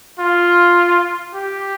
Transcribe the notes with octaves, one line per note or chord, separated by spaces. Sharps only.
F4
G4